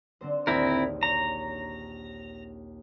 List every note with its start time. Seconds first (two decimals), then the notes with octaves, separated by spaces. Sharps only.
0.21 D3 C4 C5
0.47 A#1 D#2 C4 E4 A#4
1.03 C#5 A#5